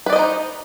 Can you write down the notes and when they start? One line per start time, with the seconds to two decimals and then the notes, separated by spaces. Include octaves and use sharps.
0.06 B4
0.10 D5
0.13 D#5
0.16 C5
0.19 D#4